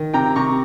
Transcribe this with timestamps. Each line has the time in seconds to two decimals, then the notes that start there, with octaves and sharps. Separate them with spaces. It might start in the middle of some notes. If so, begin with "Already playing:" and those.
Already playing: D#3
0.14 C3 G5 A#5
0.36 C3 A#5 C#6